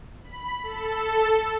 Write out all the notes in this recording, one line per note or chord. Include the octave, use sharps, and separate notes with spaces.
B5
A4